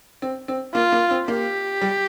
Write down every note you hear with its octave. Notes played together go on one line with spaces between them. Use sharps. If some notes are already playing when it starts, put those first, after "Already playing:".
C4
C4
A#3 F4
A#3
C4
A#3 G4
G3